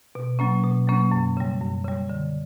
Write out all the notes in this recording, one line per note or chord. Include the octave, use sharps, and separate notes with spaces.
B2
F#3 A#3 C#4
B2
F#3 A#3 C#4
F#2
C#3 G3
F#2
C#3 G3
D3